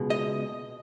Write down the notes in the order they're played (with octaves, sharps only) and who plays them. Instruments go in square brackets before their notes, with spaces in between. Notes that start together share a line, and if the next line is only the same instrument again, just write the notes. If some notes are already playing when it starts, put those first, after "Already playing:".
Already playing: [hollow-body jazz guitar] C#2 B2 G#3
D#5